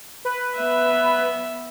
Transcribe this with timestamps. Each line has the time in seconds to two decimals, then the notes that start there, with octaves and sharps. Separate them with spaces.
0.25 B4
0.57 B3 E5